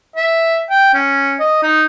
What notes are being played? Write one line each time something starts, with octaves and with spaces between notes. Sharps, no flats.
E5
G5
C#4
D#5
D#4